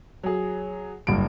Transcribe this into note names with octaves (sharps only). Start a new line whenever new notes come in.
F#3 G#4
F#1 G2 D7